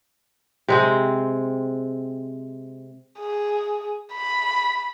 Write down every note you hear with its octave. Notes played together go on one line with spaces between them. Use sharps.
C3 G#3 C4
G#4
B5